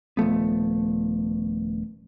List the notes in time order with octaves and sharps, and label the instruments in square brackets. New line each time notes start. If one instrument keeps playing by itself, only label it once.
[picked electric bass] D#1 F3 A3 B3